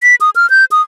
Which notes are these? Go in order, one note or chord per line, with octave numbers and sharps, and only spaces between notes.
B6
D#6
F6
G6
D#6